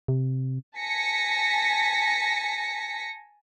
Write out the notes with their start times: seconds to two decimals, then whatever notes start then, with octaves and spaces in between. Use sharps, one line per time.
0.08 C3
0.79 G#5 A5 A#6 B6 C#7